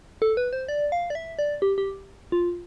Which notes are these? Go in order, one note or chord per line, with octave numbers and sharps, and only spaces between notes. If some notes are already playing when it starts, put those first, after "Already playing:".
A4
B4
C5
D5
F5
D5
E5
D5
G4
G4
F4